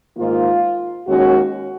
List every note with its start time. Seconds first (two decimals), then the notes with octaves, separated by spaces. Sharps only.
0.16 G#2 D#3 A#3 F4
1.06 D#2 D#3 G#3 C#4 F#4